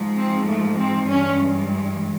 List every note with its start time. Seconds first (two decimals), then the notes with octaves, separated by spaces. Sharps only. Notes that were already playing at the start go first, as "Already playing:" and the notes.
Already playing: G#2 F3 G#3
0.16 C4
0.46 A3
0.77 C4
1.08 G2 E3 G#3 C#4